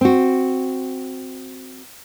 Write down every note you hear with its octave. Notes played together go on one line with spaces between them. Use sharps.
C4 F#4